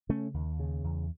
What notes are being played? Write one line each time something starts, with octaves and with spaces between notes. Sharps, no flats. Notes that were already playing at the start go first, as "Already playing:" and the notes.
C#3 A3 C#4
D#2
C#3
E2